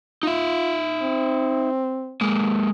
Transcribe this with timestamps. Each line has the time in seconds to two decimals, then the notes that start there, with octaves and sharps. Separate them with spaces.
0.23 D#4 F4 E5
1.02 C4
2.21 G#3 A#3